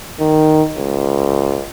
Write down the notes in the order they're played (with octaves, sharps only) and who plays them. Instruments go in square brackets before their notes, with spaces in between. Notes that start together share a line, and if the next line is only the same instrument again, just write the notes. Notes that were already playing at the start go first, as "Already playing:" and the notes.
[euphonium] D#3
C#2